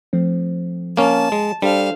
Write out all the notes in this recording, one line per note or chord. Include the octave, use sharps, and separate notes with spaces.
F3 A3 C4
A#3 C#4 A5
G#3
G3 D4 A4 C5 F5